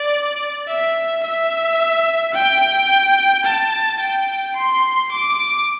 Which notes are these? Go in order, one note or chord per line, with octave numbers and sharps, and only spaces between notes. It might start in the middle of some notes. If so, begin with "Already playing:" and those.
Already playing: D5
E5
E5
G5
A5
G5
C6
D6